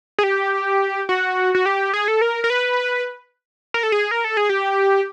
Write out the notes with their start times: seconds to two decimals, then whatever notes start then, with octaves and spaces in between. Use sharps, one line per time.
0.19 G#4
0.24 G4
1.09 F#4
1.55 F#4
1.66 G4
1.94 G#4
2.08 A4
2.21 A#4
2.44 A#4
2.50 B4
3.74 A#4
3.83 A4
3.92 G#4
4.11 A#4
4.24 A4
4.37 G#4
4.49 G4